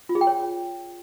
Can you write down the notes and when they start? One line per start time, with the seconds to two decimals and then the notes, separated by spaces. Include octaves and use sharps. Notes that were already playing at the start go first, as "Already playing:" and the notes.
0.09 F4
0.15 G#4
0.21 G5
0.27 C#5